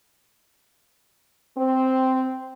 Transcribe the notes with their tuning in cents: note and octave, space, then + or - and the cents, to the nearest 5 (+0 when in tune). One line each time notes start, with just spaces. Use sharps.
C4 -5